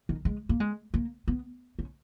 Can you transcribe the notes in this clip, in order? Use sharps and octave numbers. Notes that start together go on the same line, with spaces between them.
D#3
G#3
A#3
G#3
A#3
B3
C#4